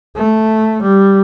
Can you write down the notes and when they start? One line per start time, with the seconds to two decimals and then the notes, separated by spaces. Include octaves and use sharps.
0.16 A3
0.82 G3